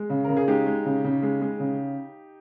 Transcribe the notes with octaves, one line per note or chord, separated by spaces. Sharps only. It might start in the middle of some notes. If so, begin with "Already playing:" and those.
Already playing: G#3
C#3
C#3 A#4
G#4
G#3 D#4 G4
G#3
C#3
C#3
G#3
G#3
C#3